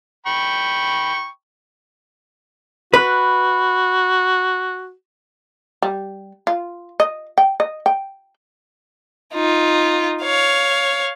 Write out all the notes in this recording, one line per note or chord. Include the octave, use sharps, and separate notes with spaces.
G5 B5 C#6
F#4 B4
G3
F4
D#5
G5
D#5
G5
D#4 F4
C#5 F5